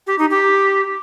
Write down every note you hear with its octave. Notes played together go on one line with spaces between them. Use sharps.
G4
D#4
G4